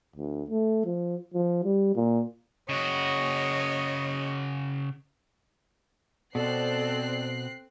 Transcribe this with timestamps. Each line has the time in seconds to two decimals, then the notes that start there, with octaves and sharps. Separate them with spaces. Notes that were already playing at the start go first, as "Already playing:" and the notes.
0.16 D2
0.50 A3
0.85 F3
1.34 F3
1.64 G3
1.96 A#2
2.69 C#3 F#4 C#5 D#5
6.35 B2 C4 A4 D5 F#6 C7